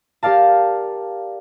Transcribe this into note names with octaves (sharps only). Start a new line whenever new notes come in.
G4 A#4 D5 F5 A5